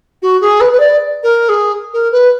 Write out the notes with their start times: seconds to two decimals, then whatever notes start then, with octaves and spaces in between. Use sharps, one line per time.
0.22 F#4
0.41 G#4
0.60 B4
0.72 B4
0.79 D5
1.23 A#4
1.49 G#4
1.93 A#4
2.12 B4